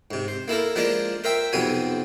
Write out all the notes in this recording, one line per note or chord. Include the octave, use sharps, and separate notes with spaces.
G#2 C3
C5
A#3 E4 A4 A#4
F3 G#3 A#3 D4 A#4 D5
A#4 C5 E5 G5
B1 F2 C3 B3 C4 G#5